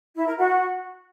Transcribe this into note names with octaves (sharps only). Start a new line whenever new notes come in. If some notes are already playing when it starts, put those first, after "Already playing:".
E4
A#4
F#4